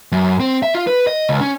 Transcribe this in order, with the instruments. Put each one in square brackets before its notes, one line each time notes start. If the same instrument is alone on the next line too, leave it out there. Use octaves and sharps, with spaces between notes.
[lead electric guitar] F#2
C4
E5
F4
B4
D#5
C#2
C#4